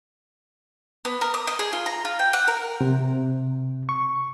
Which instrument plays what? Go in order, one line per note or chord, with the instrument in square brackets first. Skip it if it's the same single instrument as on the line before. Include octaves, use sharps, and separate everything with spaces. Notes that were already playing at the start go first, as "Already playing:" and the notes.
[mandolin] B3
A#4
D#6
D#5
G#4
F4
A#5
F4
G5
F#5
A#4
[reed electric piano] C3
C#6